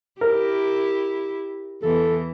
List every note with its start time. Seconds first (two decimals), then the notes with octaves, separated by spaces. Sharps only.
0.21 E4 G4 A#4
1.83 E2 E3 A4